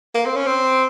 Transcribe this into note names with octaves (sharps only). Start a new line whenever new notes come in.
A#3
C4
C#4
C4